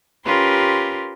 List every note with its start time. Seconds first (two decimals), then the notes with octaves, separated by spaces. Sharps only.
0.25 C#4 F4 G4 A#4 B4 C6